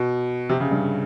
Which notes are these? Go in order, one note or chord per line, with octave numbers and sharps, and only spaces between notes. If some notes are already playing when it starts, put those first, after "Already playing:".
Already playing: B2
C3
C#3
G2